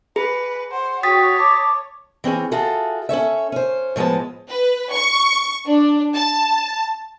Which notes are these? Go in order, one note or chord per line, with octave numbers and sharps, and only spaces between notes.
G#4 B4
C5 F#5
F#4 C#5 G5 D#6 A6 B6
A5 D6
E3 C4 C#4 G#4
F4 F#4 G#4 A4 E5
C#4 A4 C#5 E5
C#4 C5
A2 F3 G#3 B3 A5
B4
C#6
D4
A5